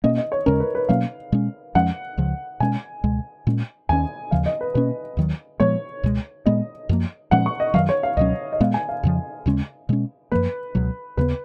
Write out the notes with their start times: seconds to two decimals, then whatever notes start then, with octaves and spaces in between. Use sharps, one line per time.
0.04 B2 A#3 C#4 D#5
0.18 D#5
0.32 C#5
0.46 D#2 C#3 G#3 C#4 A#4
0.60 B4
0.75 B4
0.89 B2 F#3 A#3 C#4 F5
1.32 B2 G#3 C#4
1.75 F2 F3 G#3 C#4 F#5
2.18 C#2 C#3 F3
2.60 B2 G#3 C#4 G#5
3.04 C#2 B2 G#3
3.47 A#2 G#3 C#4
3.89 D#2 D#3 G#3 C#4 G#5
4.31 D#2 C#3 F3 F5
4.46 D#5
4.61 B4
4.74 B2 A#3 C#4 B4
5.17 D#2 D#3 F#3
5.60 A#2 F3 G#3 B3 C#5
6.03 C#2 B2 G#3
6.46 A#2 G#3 B3 D#5
6.89 F#2 F3 A#3
7.31 A#2 F3 G#3 C#4 F#5
7.46 C#6
7.60 D#5
7.74 F#2 D#3 F#3 F5
7.89 C#5
8.03 F5
8.17 C#2 B2 F#3 C#4 D#5
8.53 D#5
8.60 A#2 G#3 B3 F5
8.74 G#5
8.89 F5
9.03 F2 C#3 F3
9.46 D#2 C#3 G#3 C#4
9.89 B2 G#3 C#4
10.32 F#2 F3 A#3 B4
10.75 C#2 B2 F#3
11.17 D#2 C#3 G#3 B3 B4